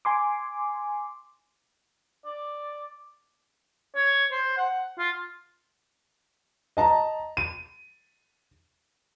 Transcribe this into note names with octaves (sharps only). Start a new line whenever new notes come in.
G#5 C6 D6
D5
C#5
C5
F#5
F4
D#5 A5 A#5
D#7